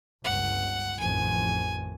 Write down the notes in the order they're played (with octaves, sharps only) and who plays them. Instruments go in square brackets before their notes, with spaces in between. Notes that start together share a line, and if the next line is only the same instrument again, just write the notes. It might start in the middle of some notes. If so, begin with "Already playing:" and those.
[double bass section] G1 C#2 [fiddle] F#5
[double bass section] A1 F2 D#3 [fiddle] G#5